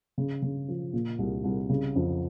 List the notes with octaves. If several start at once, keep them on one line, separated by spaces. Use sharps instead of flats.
C#3
C#3
F3
A#2
C2
C2
C#3
F2